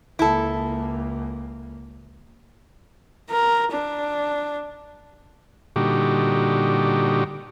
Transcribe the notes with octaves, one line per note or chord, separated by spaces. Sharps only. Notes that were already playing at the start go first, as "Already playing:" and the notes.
C#2 A#3 E4 A4
A#4
D4
A#2 D3 G3 D#4 F#4 G4